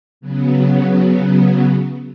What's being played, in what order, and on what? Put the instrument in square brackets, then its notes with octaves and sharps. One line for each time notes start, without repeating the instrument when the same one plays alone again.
[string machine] C#3 F#3 B3